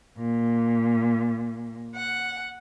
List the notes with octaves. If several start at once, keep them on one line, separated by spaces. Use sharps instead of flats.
A#2
F#5